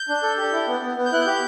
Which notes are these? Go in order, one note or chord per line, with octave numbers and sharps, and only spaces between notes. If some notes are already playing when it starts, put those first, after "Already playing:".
Already playing: G6
D4
A4
G4
E4
B3
B3
B3
G6
E4 F#6
G6
G4